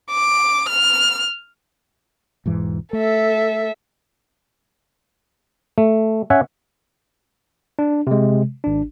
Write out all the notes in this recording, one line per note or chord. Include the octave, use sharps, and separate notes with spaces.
D6
F6
E1 G#2 E3
A3 A4 E5
A3
C#4 E5 F#5 G#5
D4
C3 G#3
G#1 D4